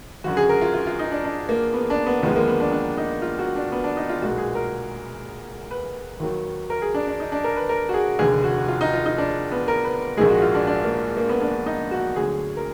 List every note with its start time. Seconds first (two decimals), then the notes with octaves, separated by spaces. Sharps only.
0.24 G#1 F#2 D3 F#4
0.37 G#4
0.49 A#4
0.61 F4
0.74 F4
0.87 F4
0.99 D#4
1.12 D4
1.24 D4
1.49 A#3
1.74 B3
1.90 D4
2.06 B3
2.23 D#2 D3 F3 G#3 B3
2.36 A#3
2.48 B3
2.60 D4
2.73 D4
2.97 D#4
3.22 F4
3.39 F#4
3.56 D4
3.72 B3
3.84 D4
3.97 D#4
4.09 F4
4.21 B1 A#2 G#3 F#4
4.38 G#4
4.55 A#4
5.71 B4
6.20 D#2 D#3 F#3
6.70 A#4
6.82 G#4
6.94 D4
7.07 D4
7.20 D#4
7.32 D4
7.44 A#4
7.56 B4
7.69 A#4
7.89 F#4
7.94 G#4
8.19 F1 D#2 D3 G#4
8.44 F#4
8.68 F4
8.81 D#4
8.93 F4
9.06 D#4
9.18 D4
9.52 B3
9.68 A#4
9.84 B4
10.17 A#1 G#2 D#3 G#3 G#4
10.30 F#4
10.42 F4
10.55 D4
10.67 D4
10.84 A#3
11.17 A#3
11.29 B3
11.42 D4
11.66 D#4
11.91 F#4
12.16 D2 D3 F#3 G#4
12.57 A#4